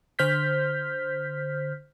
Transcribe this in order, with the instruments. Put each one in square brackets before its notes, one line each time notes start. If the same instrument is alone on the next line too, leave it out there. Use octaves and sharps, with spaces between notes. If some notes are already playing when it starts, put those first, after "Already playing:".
[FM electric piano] D3 C5 F6 G6 B6